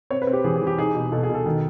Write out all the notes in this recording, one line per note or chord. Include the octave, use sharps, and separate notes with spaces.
C4 C#5
B4
C4
G4
E3 G#4
G#4
E3
G4
D#4 G#4
B2
B2 A4
G#4
B2
A4
D#3